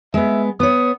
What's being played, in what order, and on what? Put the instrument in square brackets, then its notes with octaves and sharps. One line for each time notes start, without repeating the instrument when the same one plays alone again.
[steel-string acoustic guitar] G#3 B3 [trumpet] E5
[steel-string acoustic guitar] B3 C#5 [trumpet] D#6